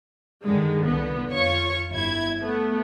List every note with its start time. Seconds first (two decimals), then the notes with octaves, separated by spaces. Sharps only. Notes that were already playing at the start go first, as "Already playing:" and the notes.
0.44 G2 D3 D#3 G#3
0.86 C2 D3 B3
1.30 F2 F4 C#5 C#6
1.91 G1 E4 G#6
2.40 A3 B3